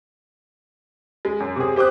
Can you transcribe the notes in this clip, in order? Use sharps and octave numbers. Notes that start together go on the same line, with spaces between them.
G#3
F#2
C3 G#4
G4 C5 D6 D#6 F#6